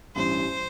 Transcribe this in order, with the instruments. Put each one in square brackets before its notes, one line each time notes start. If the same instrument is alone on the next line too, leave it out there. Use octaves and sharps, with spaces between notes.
[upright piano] A1 G2 E3 [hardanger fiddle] C5